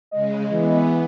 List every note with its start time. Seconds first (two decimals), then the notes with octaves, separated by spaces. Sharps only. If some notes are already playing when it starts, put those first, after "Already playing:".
0.11 C#3 G#3 D#5
0.52 E3 B3